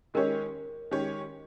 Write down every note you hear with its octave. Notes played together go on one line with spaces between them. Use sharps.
D#3 G#3 C#4 G4 A#4 C#5
D#3 G#3 C#4 G4 C#5